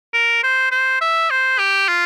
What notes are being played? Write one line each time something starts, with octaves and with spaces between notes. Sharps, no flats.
A#4
C5
C5
E5
C5
G4
F4